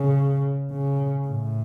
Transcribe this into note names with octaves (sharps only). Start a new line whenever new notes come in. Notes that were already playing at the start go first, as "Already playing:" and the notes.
Already playing: C#3
C#3
A2